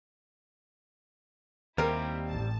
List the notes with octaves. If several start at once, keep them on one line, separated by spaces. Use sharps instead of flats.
D#2 G3 C4 E4 A#4
A1 A5